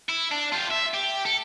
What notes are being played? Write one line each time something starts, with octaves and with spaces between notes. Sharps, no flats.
E4
D4
F4 G4
E5
G4
A4